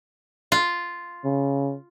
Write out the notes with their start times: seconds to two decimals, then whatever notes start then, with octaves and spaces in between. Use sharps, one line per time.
0.52 F4
1.25 C#3